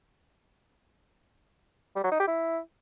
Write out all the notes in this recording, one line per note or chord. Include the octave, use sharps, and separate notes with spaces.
G3
F#3
D#4
G4
E4